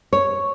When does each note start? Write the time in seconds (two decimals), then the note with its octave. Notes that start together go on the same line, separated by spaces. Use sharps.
0.13 C#5